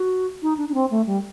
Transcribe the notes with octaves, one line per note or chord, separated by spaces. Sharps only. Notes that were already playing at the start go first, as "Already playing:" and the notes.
Already playing: F#4
D#4
D4
D4
C4
A3
G3